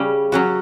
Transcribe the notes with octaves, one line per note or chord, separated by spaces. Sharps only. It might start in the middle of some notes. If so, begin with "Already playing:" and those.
Already playing: C#3 G3 C#4
F#3 C#4 F#4